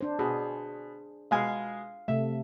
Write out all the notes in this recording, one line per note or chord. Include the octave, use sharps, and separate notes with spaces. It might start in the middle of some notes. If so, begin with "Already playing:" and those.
D4 C5
B2 G#4
B2 G#3 F5 G#5
C3 A3 E5